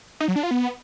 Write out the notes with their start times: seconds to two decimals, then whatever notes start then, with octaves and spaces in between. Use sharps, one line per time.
0.20 D#4
0.28 F#3
0.36 D4
0.43 F4
0.51 B3